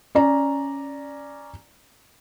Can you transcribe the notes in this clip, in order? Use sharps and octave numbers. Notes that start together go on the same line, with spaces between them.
C#4 D5 A#5